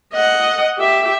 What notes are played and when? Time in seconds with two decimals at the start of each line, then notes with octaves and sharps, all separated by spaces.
0.14 D#5 F#5
0.78 G4 E5